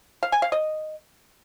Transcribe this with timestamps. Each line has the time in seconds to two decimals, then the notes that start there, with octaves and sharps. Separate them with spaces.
0.23 F5
0.32 G#5
0.42 F5
0.52 D#5